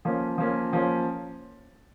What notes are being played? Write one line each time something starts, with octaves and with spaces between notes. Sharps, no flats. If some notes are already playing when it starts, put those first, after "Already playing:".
F3 A#3 C#4
F3 A#3 C#4
F3 A#3 C#4